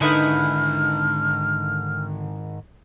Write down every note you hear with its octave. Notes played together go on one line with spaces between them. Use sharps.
G#2 D3 D#3 D#4 E4 B4 F6